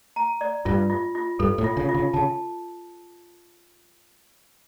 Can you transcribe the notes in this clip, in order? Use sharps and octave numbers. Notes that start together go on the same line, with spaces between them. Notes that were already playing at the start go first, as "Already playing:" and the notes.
A#5
D5
G2 F4
F4
F4
G2 A4
A2
F4
C#3
F4
C#3
C#3 A5